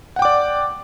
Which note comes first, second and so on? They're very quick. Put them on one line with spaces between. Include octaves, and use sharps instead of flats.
F#5 G5 D6 D5